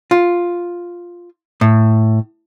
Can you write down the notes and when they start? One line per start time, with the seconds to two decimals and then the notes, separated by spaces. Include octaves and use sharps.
0.11 F4
1.61 A2